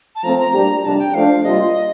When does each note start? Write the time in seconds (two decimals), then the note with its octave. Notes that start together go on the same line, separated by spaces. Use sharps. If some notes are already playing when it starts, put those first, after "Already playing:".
0.16 A5
0.24 F3 A3 C4 A#5
0.39 A#5
0.54 A#2 G3 D4 G4
0.83 F2 C3 G3 D4 A5
0.99 G5
1.14 F3 A3 D4 F4 F5
1.44 C3 G3 A#3 F4 D#5